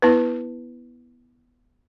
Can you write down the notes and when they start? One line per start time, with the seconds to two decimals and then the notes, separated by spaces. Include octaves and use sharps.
0.02 B3 E4 B4